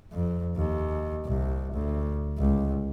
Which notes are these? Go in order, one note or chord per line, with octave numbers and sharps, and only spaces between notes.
F2
D#2
C2
D2
C#2